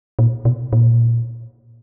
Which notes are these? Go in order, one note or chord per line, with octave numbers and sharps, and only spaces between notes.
A#2
B2
A#2